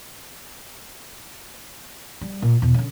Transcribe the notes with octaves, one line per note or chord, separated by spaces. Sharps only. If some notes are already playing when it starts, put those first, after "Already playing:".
G3
A#2
E2 B2
D3 C#4